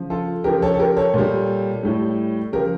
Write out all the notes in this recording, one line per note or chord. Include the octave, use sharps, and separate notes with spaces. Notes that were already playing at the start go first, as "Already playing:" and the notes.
Already playing: C#3 F3
F4 A4
C#3 F3 G4 A#4
A4 C#5
A4
G4 A#4
A4 C#5
A#2 G3
A2 G3
C#3 F3 G4 A#4